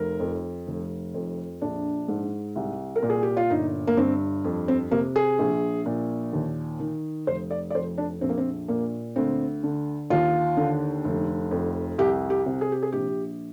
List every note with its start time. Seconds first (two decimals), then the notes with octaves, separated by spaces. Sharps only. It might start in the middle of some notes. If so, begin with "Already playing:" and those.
Already playing: F1 A#4
0.20 F2
0.67 F1
1.14 F2
1.61 A#1 D4
2.08 G#2
2.56 C2
2.96 A#4
3.03 A#2
3.10 G#4
3.23 G4
3.37 F4
3.50 G1 D#4
3.87 A#3
3.97 G2 C4
4.44 F2
4.68 C4
4.91 C3 A#3
5.16 G#4
5.39 A#1
5.86 A#2
6.33 D#2
6.80 D#3
7.27 F1 C5
7.51 D5
7.70 D5
7.74 F2 C5
7.98 D4
8.21 A#1 C4
8.29 A#3
8.38 C4
8.68 A#2 A#3
9.16 D2 C4
9.63 D3
10.10 D#2 F4
10.57 D3
11.04 F1
11.51 F2
11.98 C2 G4
12.30 G4
12.46 C3
12.61 G#4
12.72 G4
12.83 G#4
12.92 A#1 G4